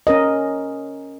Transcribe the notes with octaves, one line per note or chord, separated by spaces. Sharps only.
C#4 A#4 D#5